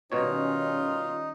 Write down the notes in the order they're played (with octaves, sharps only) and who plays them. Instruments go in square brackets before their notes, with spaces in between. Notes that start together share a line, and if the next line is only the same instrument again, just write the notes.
[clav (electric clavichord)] B2 C#5 [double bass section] D#3 G3 C#4 [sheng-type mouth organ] D#4 [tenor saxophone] F4